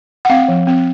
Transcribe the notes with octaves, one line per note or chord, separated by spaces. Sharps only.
F#5
C4 F5
F3
C4